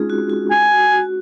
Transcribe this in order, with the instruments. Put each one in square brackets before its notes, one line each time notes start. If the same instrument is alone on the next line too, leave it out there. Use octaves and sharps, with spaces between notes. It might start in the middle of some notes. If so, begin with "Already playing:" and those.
Already playing: [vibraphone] G#3 C4 C#4 D#4 F4 G#4
F#4
F#4
[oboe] G#5
[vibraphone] F#4
F#4